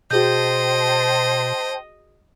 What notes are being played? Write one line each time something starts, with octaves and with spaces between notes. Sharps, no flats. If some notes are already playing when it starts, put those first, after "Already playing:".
B2 F#4 G#4 C5 D#5 G5 A5 G6